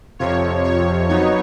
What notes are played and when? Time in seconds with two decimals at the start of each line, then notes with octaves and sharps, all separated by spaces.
0.19 F2 C3 F3 C#5
0.64 C#5
1.09 F#3 B3 D#4 C#5